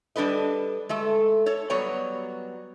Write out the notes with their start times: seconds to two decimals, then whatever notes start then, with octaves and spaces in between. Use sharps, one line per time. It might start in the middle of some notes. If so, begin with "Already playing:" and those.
0.16 G3 D4 A4 B4 D#5
0.89 G#3 A3 A4
1.46 A4 C#5
1.70 F#3 G3 B3 C#5 D5 A#5